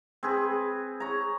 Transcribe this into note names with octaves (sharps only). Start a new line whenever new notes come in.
C4 G#4 B4
C#5 A#5